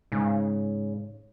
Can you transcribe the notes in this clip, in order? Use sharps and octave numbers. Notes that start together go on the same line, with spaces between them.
G#2 C#3